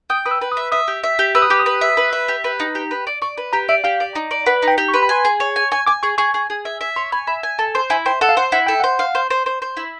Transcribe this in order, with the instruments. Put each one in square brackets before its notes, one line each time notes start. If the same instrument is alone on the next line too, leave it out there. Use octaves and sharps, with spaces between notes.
[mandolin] G5 [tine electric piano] D#6
[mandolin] B4 [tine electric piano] D#6
[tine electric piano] E6
[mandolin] B4
[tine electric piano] D#6
[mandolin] E5
[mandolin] E5 [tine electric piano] D#6
[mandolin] G4
E5
G4
[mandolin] B4 [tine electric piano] E6
[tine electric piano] D#6
[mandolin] G4 [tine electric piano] D6
[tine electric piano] D#6
[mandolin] B4
E5
B4
E5
G4
B4
D#4
G4
B4
D5
[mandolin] D5 [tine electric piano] C#6
[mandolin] B4
[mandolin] G4 [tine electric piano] A#5
[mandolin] D5 [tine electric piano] E5
[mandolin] G4 [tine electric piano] F5
[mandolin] D5
D#4
D5
[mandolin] B4 [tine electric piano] F#5
[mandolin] D#4
[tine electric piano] G5
[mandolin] G4
[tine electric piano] C#6
[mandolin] B4 [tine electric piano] C6
[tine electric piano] B5
[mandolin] G#5 [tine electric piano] C6
[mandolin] G#4
C#5
G#5
[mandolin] G#5 [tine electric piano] C#6
[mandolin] G#5 [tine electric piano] D6
[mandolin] G#4 [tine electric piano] C#6
[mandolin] G#4 [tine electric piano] C#6
[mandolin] G#4
G#4
E5
E5
[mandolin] C#5 [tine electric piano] C6
[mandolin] G#5 [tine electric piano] B5
[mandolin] E5 [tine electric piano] B5
[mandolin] G#5
[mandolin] A4 [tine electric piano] A5
[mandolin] C5 [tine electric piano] C6
[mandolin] E4 [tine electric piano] G#5
[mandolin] C5 [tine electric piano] G5
[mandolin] A4 [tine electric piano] F#5
[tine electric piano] F5
[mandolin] C5 [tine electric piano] F#5
[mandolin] E4 [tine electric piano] F#5
[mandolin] A4 [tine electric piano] G5
[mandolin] C5 [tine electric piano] F#5
[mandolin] F5
C5
C5
C5
C5
E4